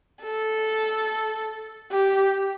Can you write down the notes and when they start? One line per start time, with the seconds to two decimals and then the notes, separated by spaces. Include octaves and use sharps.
0.23 A4
1.92 G4